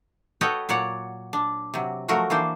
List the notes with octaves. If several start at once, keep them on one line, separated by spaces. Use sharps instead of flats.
F#4 A4 B4 C#5 D#5 G5
A#2 F#3 C#5 D5 F#5
D4
C3 F#3
F3 F#3 A3 F#4 A#4
E3 A#3 D4 C5